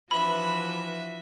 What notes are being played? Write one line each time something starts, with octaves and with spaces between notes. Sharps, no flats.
E3 F3 D4 F4 F#4 B4 E5 B5